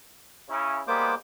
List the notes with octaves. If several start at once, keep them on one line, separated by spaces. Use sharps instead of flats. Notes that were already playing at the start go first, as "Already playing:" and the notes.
C#3 C#4 E4
G3 G#3 A#3 B3 C5 D6